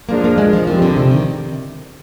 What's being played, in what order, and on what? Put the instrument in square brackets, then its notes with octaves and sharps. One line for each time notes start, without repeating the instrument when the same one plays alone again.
[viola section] F3 G#3 D4 F4 A#4 [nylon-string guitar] A#3
[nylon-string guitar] A#3
G#3
F3
[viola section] D#3 G3 C4 [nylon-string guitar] F3
[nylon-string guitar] D3
C3
D#3